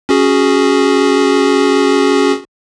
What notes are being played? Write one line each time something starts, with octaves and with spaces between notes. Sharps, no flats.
C#4 F#4 G#4